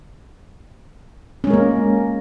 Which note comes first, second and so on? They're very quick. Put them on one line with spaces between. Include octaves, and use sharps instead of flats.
C#4 G#3 A#4 A#3